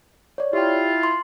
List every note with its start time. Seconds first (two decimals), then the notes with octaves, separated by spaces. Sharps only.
0.38 C#5 D5
0.53 E4 F4 G4 G5
1.03 C6